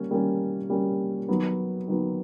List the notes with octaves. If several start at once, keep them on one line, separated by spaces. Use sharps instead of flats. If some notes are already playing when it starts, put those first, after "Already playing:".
Already playing: G3 A#3 C#4
G3 A#3 C#4
G3 A#3 C#4
D#3 F#3 B3
D#3 F#3 B3